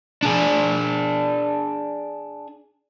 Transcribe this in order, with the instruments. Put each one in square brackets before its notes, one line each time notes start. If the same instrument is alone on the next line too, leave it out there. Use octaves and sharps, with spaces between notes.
[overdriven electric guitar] D4 G#4